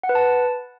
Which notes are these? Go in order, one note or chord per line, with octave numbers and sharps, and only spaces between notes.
F#5
B4
A5